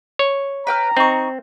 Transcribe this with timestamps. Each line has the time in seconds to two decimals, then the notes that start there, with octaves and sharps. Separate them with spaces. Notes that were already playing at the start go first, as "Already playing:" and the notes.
0.19 C#5
0.67 B4 G5 A#5 F6
0.97 C4 D#4 C#6